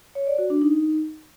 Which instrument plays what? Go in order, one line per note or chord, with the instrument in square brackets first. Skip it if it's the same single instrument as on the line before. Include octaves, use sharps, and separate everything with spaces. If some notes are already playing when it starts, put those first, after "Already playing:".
[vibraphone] C#5
D5
F#4
D4
D#4